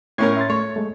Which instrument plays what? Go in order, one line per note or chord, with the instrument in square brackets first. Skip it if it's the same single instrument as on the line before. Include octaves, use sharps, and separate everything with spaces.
[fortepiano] A2 C#4 A#4 [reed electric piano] G#6
[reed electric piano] E5 C6 A6
[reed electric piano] A3 C#6 [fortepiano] C#5
[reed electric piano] G#3 A3